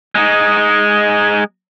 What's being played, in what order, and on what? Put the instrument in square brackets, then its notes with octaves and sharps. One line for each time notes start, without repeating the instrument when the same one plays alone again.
[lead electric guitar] G#3 D#4